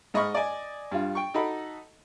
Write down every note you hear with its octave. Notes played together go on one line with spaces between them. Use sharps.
G#2 D#5 B5 C#6 F6
D5 D#5 G#5
G2 F4
G5 C#6
D#4 F#4 A4 D#5 B5